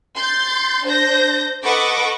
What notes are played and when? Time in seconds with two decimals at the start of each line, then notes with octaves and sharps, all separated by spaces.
0.16 C6 G6 A6
0.85 D4 C5 G6 A#6
1.63 A4 B4 D#5 F#5 C#6 D6